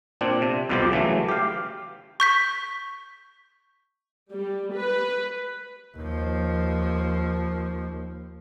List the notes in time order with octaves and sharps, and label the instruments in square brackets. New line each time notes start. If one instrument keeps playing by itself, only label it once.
[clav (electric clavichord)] A#2 C4 D4
C3
C2 F2 B2 F3 C4 G4
C#3 E3 F#3 A3
G4 F5
[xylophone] C#6 G6 B6
[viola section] G3
B4
[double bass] D#2 F3